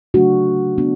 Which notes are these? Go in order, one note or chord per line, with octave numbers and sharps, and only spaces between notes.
C#3 F#3 A3 D4 F#4
B3 D4